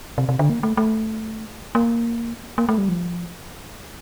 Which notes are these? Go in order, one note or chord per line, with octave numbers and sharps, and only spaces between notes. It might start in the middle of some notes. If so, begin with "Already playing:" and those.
C3
C3
D3
A#3
A3
A3
A#3
A#3
A3
G3
F3